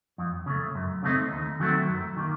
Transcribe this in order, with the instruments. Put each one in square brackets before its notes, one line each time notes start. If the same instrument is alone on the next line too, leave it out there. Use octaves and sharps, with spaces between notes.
[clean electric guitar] F2
C#3 A3
F#2
C#3 A3 C4 D#4
D#2
D#3 F#3 A3 C4
F#2
D#3 A#3